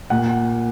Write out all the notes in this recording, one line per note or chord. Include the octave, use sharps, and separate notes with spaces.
A#2 F#5